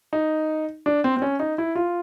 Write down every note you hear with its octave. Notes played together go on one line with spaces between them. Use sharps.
D#4
D4
C4
C4
C#4
D#4
E4
F4